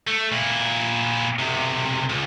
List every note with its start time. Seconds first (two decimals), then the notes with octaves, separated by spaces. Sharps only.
0.07 A3
0.32 A#2 E4
1.39 B1 C3
2.09 C#2